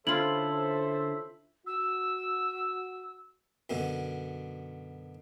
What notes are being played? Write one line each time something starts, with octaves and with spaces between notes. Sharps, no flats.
D3 C#4 E4 F4 A4 C5 E5 F#7
F#4 E6
F#2 B2 D3